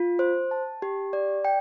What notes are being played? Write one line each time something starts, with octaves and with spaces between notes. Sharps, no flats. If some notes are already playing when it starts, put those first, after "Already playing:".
Already playing: F4
C5
A5
G4
D5
G5